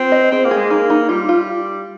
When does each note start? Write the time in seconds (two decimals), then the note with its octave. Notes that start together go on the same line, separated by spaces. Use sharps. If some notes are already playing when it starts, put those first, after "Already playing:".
Already playing: C4 F4
0.12 D#5
0.31 C4 G#4
0.45 A#3
0.51 G#4
0.57 G#3
0.70 A#3 D#4
0.90 D#4
1.09 G3 F4
1.29 F4